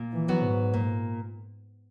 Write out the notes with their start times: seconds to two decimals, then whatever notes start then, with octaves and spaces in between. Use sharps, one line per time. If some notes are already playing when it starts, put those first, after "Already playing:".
Already playing: A#2
0.13 E3
0.28 F#3 B3 F#4
0.42 G#2
0.74 A#2